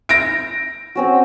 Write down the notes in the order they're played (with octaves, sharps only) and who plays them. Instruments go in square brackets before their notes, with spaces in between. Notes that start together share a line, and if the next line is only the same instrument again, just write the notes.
[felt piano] A#6 D7
[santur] C4 C#4 F#4